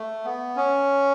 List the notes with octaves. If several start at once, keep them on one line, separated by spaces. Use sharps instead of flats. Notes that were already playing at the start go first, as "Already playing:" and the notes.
Already playing: A3
B3
C#4